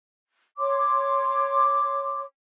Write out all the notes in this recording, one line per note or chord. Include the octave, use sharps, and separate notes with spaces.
C#5 C6 D6